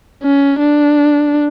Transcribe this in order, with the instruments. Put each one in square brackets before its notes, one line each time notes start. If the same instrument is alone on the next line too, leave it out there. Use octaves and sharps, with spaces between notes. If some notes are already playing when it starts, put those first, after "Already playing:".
[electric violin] C#4
D4